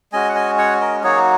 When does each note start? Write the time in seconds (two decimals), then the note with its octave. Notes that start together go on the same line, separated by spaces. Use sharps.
0.12 G#3 C#4 F#4 D#5 G#5
0.29 F#5
0.35 D#5 G#5
0.58 C#5 F#5
0.80 A#4 D#5
1.03 F#3 A#3 D#4 F#4 G#4 C#5